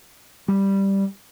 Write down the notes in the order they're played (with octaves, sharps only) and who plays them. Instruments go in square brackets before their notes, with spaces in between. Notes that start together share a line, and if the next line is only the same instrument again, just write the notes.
[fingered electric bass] G3